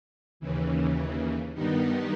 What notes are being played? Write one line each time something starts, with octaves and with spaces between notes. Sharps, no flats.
D#2 C#3 E3
G2 D#3 G3 B3 D#4